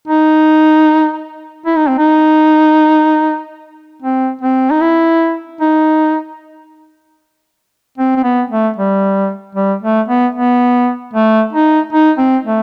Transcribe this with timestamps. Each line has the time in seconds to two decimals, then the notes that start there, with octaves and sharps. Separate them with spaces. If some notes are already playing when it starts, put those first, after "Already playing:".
0.08 D#4
1.66 E4
1.77 D#4
1.88 C4
1.98 D#4
4.02 C4
4.42 C4
4.71 D#4
4.81 E4
5.61 D#4
7.98 C4
8.16 C4
8.24 B3
8.50 A3
8.76 G3
9.55 G3
9.83 A3
10.08 B3
10.35 B3
11.14 A3
11.53 D#4
11.93 D#4
12.18 C4
12.45 A3